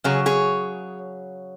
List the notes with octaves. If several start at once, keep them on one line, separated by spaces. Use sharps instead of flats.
C#3 F#3 G#4 C#5
G#4 C#5